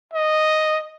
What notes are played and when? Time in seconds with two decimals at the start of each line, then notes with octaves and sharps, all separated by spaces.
0.13 D#5